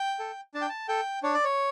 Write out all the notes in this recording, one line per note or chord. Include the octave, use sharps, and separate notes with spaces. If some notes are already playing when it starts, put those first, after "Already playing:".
Already playing: G5
A4
D4 A5
G5
A5
A4 G5
D4 C#5
D5
C#5